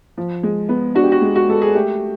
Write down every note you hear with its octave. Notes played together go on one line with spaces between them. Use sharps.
F3
G#3
B3
D4 F#4
G4
F#4
G#3
F#4
G#3 A4
G#4
A3 G4